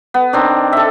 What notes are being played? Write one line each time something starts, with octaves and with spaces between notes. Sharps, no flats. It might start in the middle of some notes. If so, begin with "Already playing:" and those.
B3
D#3 C4 D4
A4 E5